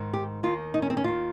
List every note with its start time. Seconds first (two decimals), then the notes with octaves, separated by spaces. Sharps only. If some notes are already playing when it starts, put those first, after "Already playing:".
Already playing: G#2 D#3
0.13 G4
0.43 D#2 D#3 F4
0.74 D#4
0.82 C#4
0.90 C4
0.97 C#4
1.04 D#2 D#3 F4